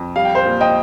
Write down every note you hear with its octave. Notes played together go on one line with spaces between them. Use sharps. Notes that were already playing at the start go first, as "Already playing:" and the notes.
Already playing: F2
G3 F5
G5
C5 F5
A#2
D#5 G5